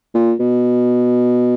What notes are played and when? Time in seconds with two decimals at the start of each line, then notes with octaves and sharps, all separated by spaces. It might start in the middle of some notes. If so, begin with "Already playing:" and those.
0.15 A#2
0.40 B2